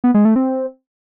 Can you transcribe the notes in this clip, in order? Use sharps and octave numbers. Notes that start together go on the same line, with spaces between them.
B3
G#3
A3
C4